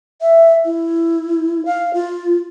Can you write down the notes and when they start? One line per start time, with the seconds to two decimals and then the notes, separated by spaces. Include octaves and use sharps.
0.21 E5
0.65 E4
1.65 F5
1.94 F4